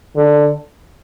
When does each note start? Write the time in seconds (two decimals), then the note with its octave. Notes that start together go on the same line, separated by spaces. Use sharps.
0.16 D3